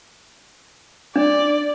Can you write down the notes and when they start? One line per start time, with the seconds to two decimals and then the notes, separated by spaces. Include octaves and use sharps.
1.16 D4 D5